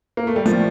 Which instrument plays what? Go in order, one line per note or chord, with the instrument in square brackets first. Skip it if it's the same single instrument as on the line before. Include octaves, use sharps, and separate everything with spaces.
[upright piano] A#3
A3
G3
[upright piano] F3 [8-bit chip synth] A3